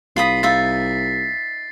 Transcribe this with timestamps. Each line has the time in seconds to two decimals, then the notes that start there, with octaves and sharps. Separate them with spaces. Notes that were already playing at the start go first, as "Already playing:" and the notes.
0.16 C2 F4 B5 D#6 B6 C7
0.43 D#4 F4 E5 A6